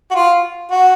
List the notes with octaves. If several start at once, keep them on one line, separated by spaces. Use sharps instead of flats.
F#4
F4
F#4